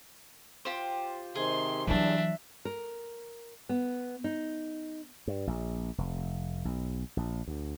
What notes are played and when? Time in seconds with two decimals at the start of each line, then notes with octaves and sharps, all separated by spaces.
0.65 F4 G4 C5
1.35 C3 D#3 G#4 C6
1.87 E2 G2 E3 F#3 D4 E5
2.65 A#4
3.69 B3
4.24 D#4
5.27 G2
5.47 A#1
5.98 F1
6.65 B1
7.17 A#1
7.48 D2